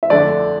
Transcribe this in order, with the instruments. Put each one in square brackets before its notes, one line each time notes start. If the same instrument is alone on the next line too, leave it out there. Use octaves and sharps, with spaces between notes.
[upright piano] E5
[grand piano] G1 F2 D3 A3 D4 [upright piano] D5